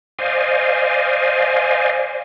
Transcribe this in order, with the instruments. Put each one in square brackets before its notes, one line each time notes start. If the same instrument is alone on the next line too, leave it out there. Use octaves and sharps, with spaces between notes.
[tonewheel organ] C5 D5 D#5 F5 G#5